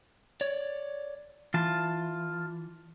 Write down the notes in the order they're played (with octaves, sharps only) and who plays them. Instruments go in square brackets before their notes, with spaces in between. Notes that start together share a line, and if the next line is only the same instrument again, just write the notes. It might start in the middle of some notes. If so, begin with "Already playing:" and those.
[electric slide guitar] C#5 D5
[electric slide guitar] E3 [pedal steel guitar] F4 A5